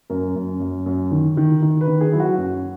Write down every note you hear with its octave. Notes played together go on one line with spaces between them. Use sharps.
F#2 A#4
F#2
F#2
F#2
D#3
D#3
D#3
B4
D#3
G#4
F#3 E4
F#4
F#2